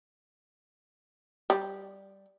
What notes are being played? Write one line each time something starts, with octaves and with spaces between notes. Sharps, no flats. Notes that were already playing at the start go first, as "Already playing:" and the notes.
G3